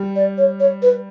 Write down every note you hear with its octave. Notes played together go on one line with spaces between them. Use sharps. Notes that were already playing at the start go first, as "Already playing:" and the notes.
Already playing: G3
D5
C#5
C#5
B4